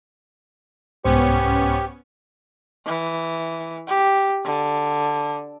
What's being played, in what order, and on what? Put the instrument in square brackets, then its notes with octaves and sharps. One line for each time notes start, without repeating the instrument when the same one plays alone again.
[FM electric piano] C2 G#2 C5 [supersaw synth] B3 C#4 C#6 [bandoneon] G4
[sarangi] E3
G4
D3